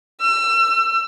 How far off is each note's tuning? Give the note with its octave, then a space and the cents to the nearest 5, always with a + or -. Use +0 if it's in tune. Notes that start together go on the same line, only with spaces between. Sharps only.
E6 +35